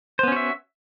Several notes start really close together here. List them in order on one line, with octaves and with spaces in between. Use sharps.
C5 B3 C#4 F#4 E5